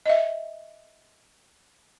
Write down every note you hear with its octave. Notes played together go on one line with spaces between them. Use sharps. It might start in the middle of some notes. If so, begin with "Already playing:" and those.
D#5 E5